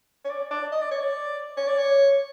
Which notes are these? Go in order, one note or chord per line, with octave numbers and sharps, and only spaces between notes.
C#5
D5
D5
D#5
D5
C#5
D5
C#5
D5
C#5